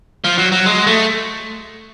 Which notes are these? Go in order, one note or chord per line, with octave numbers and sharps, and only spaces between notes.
F3
F#3
F#3
G#3
A3